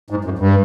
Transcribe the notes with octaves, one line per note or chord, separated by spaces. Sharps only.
G#2
F#2
G2